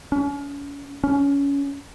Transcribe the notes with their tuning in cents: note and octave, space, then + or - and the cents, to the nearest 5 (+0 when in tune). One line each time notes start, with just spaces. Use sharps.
C#4 +35
C#4 +20